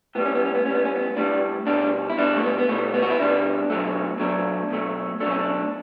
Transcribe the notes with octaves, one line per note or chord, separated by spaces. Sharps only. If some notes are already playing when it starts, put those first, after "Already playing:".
A2 G3 B3
C#4
B3
C#4
B3
A2 G3 C#4
B3
C#4
B3
A2 G3 D4
B2 G3 D4
E4
B2 G3 D4
A3
B3
B3
B2 G3 A3
B3
F#4
E4
B2 G3 D4
B2 F#3 A3
B2 F#3 A3 D4
B2 F#3 A3
B2 F#3 A3 D4
C#4
D4